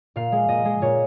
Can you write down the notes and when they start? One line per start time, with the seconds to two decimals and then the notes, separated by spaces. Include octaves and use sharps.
0.16 A#2 F5
0.32 G#3
0.48 A#2 D#5
0.65 G#3
0.82 A#2 C#5